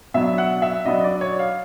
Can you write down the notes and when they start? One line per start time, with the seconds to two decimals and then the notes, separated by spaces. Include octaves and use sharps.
0.14 B2 F#3 B3 D4 E5
0.38 F#5
0.62 E5
0.85 B2 F#3 B3 D4 D#5
1.04 D5
1.21 C#5
1.39 F5